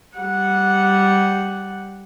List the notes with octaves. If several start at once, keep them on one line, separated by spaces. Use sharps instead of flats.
G3 F#5